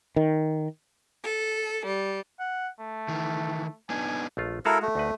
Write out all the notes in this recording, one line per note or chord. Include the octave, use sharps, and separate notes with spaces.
D#3
A4
G3
F#5
A3
D#3 E3
B3 D4 D#4 G#5
A#1 A3 F4
G#3 E4 F#4 A4 A#4 F5
A3
D2 D#4 B4